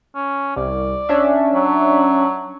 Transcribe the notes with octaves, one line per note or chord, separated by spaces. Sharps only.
C#4
C2 D5
C#4 D4 E5
F#3